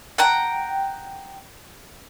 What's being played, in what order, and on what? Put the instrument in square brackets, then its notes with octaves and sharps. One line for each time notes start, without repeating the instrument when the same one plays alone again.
[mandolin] F#5 G5 A#5